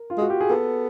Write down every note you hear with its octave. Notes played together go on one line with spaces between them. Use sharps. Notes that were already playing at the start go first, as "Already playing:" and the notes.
Already playing: A#4
F4
G#3 F#4
G4
G#4
B3 A4